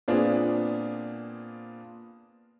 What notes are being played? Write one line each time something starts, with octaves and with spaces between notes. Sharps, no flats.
A#2 B3 C4 D4 F4 G#4